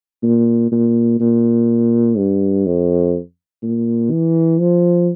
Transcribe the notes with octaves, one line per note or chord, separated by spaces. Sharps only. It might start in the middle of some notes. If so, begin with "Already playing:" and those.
A#2
A#2
A#2
G2
F2
A#2
E3
F3